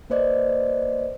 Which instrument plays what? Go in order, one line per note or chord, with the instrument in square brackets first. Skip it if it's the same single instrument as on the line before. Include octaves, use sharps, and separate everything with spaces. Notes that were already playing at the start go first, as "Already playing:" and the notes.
[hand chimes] A#3 B4 C5 D5 D#5